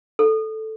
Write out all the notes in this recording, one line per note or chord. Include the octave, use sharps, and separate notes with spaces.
A4